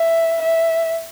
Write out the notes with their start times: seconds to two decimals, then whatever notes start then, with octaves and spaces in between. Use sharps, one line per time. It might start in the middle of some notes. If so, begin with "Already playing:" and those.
Already playing: E5
0.42 E5